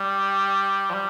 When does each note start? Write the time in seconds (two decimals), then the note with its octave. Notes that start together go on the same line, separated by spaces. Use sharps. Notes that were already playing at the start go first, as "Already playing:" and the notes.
Already playing: G3
0.90 F3
0.94 G3